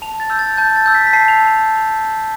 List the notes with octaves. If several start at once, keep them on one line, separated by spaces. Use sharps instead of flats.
A5 F7
A6
E6 G6
A6
A5 G6
A6
E6 G6
B6
B6
A5 C7
F7